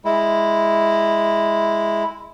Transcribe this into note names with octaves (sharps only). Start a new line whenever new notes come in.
G#3 E4